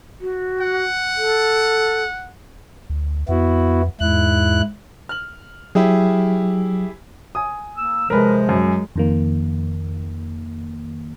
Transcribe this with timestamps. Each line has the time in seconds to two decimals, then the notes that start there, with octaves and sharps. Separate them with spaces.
0.21 F#4
0.60 F#5
1.16 A4
2.90 D2
3.29 F2 B3 E4 F#4
4.01 E2 G#2 E4 F#6
5.09 F6 F#7
5.75 F#3 E4 G4 G#4
7.35 G#5 D#6
7.76 A#3 E6
8.10 C3 F3 G#3 A#4 B4
8.49 F#2
8.96 F2 D#3 A#3